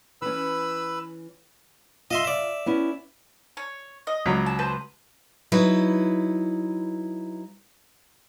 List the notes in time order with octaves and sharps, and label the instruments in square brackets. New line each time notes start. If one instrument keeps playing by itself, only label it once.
[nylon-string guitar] E3 C#4 [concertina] B4 B5 E6
[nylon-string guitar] F4 [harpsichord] D#5 E5 C6
[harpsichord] D5 E5
[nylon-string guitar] B3 C#4 E4
[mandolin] C#5
D#5
[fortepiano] C#2 F#3
[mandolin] A5
B4 C5 A5
[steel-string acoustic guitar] F#3 D#4 E4 B4